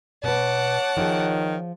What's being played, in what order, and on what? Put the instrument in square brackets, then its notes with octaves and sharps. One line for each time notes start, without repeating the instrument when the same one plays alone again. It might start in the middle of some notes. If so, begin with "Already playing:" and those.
[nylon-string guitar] B2 B4 [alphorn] C#5 [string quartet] F#5 A5 D6
[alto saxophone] D#3 [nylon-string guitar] F3 F4 G#4